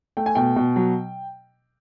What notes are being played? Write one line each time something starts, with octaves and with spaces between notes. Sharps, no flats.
A3 G5
G#5
B2 G5
B2
F#3